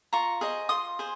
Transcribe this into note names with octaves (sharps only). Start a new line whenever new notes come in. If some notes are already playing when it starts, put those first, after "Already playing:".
F4 A#5 C#6
G#4 C5 D#5
F4 C6 D#6
G#4 C5